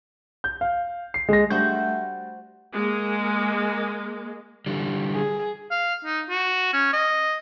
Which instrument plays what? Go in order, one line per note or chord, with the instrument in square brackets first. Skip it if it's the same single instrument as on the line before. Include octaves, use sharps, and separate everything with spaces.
[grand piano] G6
F5
C7
G#3 A#6
[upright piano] G3 D4 [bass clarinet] A3 [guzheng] F#4 C5 F#5 [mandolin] G6
[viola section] G#3 A#3
[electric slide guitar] D3 E3 G3
[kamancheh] G#4
[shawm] F5
D#4
F#4
C#4
D#5